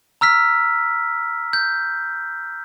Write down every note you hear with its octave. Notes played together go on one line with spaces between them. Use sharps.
A#5 E6 F6 B6
G6